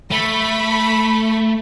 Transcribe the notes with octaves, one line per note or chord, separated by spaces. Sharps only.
A3 B5